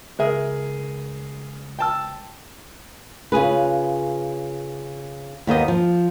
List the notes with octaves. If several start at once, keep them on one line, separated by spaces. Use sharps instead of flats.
C#2 G#4 A#4 E5
G5 A5 E6
C#3 F4 G#4 B4
D#2 D#3 B3 D#5
F3